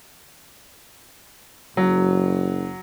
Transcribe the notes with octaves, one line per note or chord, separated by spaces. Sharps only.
F#1 F#3